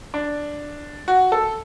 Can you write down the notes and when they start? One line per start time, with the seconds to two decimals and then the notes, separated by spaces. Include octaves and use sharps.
0.14 D4
1.08 F#4
1.32 A4